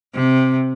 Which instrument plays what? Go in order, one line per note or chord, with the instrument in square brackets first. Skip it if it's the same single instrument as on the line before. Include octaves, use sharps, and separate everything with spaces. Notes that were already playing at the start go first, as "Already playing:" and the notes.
[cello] C3